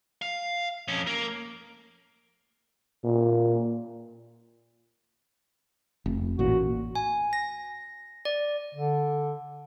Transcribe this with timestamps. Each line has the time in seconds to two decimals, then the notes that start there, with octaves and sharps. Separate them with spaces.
0.22 F5
0.88 F2 C#4
1.07 A#3
3.04 A#2
6.06 F1
6.39 A1 A#2 F#4
6.95 G#5
7.33 A#6
8.25 D5
8.75 D3